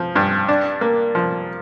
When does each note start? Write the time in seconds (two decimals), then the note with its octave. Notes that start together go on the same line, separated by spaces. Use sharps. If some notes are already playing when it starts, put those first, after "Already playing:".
Already playing: F3
0.15 G2
0.48 D4
0.81 A#3
1.15 F3